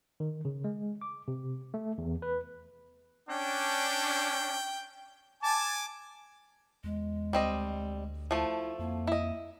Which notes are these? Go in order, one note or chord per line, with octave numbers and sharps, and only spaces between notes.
D#3
C#3
G#3
D6
C3
A3
E2
B4
C#4 D4 G5
G#5 A5 D6
E2 G#3
D2 G3 C4 D#5
F3 A3 E4
F2 A#3
E4 D#5